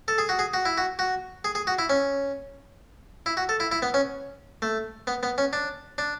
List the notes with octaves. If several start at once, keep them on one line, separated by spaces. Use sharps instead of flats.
A4
G#4
F#4
G#4
F#4
E4
F#4
F#4
G#4
G#4
F#4
E4
C#4
E4
F#4
A4
E4
E4
B3
C#4
A3
B3
B3
C#4
D4
D4